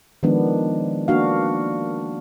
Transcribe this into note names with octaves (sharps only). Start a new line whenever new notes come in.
D#3 F3 G#3 B3 D4
A#3 D4 F#4 F5